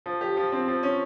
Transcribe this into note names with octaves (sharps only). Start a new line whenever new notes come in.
F3
G4
F3
C4
F3
C#4